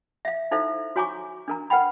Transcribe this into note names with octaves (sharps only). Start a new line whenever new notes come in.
E5 F5
D#4 E4 A4 C5 E5 F5
F#4 C#5 G#5 A#5 C#6 D6
D4 A#4 A#5
A#4 B4 F#5 G5 B5